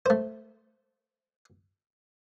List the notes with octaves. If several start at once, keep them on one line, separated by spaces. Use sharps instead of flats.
A3 C5